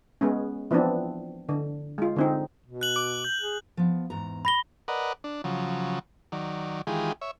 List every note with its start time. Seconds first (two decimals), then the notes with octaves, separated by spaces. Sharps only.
0.21 G#3 B3 C#4
0.71 E3 F3 B3 C4 D4
1.49 D3
1.98 G#3 F4
2.16 D3 C4 D#4
2.66 B2
2.81 F#6 F#7
2.96 D6
3.25 G6
3.41 G#4
3.77 F3 B3
4.10 E2 G#2 A#5
4.45 B5 A#6 G7
4.88 A#4 B4 D5 D#5 F#5
5.24 D4
5.44 C#3 F3 F#3
6.32 D#3 F#3 D5
6.87 D#3 E3 G#3 F4 G4 G#4
7.21 C#5 E5